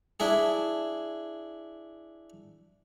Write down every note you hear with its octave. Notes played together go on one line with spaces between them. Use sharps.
D4 E4 G#4